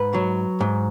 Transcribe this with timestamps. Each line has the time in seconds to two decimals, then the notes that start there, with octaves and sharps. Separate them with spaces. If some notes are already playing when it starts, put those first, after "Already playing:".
Already playing: G#2 B4
0.14 F#3
0.61 G#2